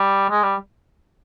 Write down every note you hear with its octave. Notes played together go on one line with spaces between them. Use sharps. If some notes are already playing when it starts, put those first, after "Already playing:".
Already playing: G3
G#3
G3